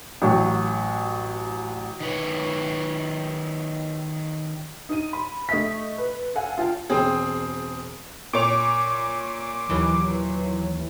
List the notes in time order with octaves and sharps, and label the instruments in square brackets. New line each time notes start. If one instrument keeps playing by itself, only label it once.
[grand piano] A1 F#3
[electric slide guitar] D#3 B4 C#5
[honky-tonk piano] D#4 D#7
B5
A3 D#5 E5 B6
B4
A4 F5 F#5 G#5
F4 F5 G5 A5
[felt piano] E1 C4 G#4
[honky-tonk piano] A#2 C#5 F7 [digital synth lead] D6
[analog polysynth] D#2 E3 [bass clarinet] F#3